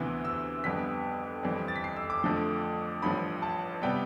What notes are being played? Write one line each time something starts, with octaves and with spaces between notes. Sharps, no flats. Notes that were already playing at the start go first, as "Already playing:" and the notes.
Already playing: D2 C3 E3 B3
E6
F2 D3 G3 B3 B6
F2 E3 G3 C4
A6
B6
C7
E6
D6
F2 D3 F3 A3
A1 G2 F3 B5
A5
C3 G3 B3 G5